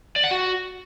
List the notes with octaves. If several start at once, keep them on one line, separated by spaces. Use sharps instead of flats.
D5
F#5
F#4